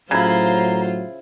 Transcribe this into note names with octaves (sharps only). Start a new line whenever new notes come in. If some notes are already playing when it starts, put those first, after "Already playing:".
A2 C#3 F#3 E4 F4 C5 A#5